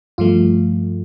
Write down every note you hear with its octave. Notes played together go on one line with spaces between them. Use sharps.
G2 F3 A3 F4